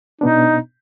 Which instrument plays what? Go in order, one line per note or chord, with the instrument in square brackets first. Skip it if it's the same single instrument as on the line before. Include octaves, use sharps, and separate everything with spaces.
[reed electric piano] B2 B3 D4 [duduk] D#4